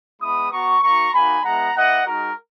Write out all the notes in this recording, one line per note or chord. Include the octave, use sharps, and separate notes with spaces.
G#3 B3 E4 B5 D#6
B3 F#4 A#5 C#6
A#3 D#4 F#4 A#5 C#6
A#3 D#4 F#4 G#5 B5
G#3 B3 E4 F#5 A#5
A#3 E4 D#5 F#5
G#3 D#4 F#4 A#4